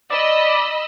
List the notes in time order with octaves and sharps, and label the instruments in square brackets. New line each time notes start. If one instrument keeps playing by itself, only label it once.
[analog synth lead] D5 [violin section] D#5 B5 E6